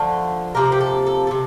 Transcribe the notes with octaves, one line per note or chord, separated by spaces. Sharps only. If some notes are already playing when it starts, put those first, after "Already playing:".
Already playing: D3 F3 A3
C3 F3 A#3 A#4
G4
A4
A4
A4
C3